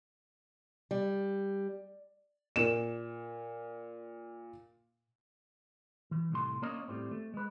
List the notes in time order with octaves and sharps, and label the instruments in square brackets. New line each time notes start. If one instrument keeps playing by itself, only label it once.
[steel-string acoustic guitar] G3
[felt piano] A#2 E7
[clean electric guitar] E3
C2 A2 C6
A#3 C#4 D4 A#4 C#5 D#5
A2 G3 C4
A3
G#3 B4